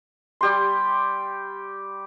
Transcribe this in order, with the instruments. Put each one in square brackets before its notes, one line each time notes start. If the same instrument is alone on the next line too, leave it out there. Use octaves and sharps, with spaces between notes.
[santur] G3 G4 C6